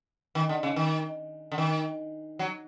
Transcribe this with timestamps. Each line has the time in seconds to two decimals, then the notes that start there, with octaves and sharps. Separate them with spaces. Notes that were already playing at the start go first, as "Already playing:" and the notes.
0.35 D#3
0.49 D3
0.63 C#3
0.76 D#3
1.52 D3
1.58 D#3
2.39 F#3